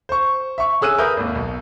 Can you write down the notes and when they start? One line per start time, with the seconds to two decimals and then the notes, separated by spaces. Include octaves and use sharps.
0.09 C5 C#6
0.58 E5 C#6
0.81 C#4 G#4 E6 F#6 D#7
0.98 A#4 B4 E5 B5 D#6 G6
1.17 G#1 D#2
1.35 B1